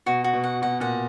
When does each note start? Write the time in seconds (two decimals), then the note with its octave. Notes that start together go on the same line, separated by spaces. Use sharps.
0.06 B2 F#4
0.24 F#4
0.33 B2
0.44 F#5
0.62 B2 F#5
0.80 A#2 F#5